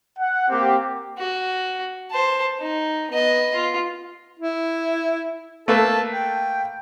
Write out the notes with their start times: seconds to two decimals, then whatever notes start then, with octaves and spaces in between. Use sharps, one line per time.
0.19 F#5
0.49 A#3 C4 G4
1.18 F#4
2.11 C5 A5
2.59 D#4
3.11 B3 D#5
3.55 F4
4.40 E4
5.68 A3 A#3 A4 B4
6.13 G5